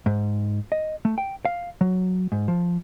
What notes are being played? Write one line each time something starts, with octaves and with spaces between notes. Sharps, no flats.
G#2
D#5
A3
G5
F5
F#3
G#2
F3